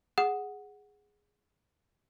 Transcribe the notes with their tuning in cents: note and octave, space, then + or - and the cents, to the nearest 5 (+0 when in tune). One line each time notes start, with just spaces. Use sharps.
G#4 +0 F#5 +0 D#6 +0